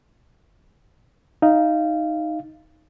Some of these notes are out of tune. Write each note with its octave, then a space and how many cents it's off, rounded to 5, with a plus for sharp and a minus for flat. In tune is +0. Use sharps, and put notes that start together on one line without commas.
D#4 +0 F5 -20